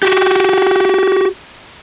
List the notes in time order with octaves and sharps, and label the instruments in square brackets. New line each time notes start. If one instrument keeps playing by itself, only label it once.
[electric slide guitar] F#4 G4